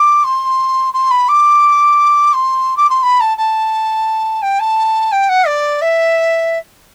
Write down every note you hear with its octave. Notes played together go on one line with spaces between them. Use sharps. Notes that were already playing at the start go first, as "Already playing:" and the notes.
Already playing: D6
C6
C6
B5
D6
C6
D6
C6
B5
A5
A5
G5
A5
G5
F#5
D5
E5